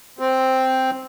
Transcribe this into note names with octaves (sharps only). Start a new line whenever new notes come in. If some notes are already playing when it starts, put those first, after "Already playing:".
C4